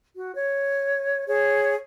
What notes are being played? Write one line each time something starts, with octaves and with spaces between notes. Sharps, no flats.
F#4
C#5
G#4 C#5